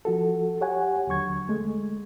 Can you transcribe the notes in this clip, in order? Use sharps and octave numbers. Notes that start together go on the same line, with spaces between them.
F3 F#4 A4
G4 C#5 F#5 G#5
D#2 D3 F#3 C#6 G#6
G#3 A3